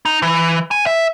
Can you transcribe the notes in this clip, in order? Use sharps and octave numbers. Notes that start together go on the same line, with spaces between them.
D#4
E3
G#5
E5